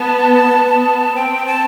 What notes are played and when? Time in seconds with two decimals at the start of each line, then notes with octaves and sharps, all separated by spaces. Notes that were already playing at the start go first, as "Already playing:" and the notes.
Already playing: B3 A5
0.54 B3
1.15 C4 G5
1.46 A5